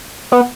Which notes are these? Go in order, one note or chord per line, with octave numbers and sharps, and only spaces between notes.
B3